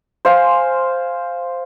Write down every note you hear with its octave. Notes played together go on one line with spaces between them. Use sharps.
C5 F5 G#5 C6